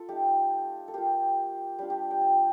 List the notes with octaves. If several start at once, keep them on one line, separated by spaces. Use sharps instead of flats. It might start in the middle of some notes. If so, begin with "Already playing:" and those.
Already playing: F4 A4
A3 D#4 G4
A4
A#3 F4 G4
G3 D4 F4 G4
G4
G5
A5